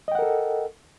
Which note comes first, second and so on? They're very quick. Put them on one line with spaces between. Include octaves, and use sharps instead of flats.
D#5 G5 F#5 A#4 A4